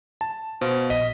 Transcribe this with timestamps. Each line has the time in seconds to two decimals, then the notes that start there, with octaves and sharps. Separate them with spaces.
0.21 A5
0.61 B2 C5 F5
0.90 A#1 D#5 B6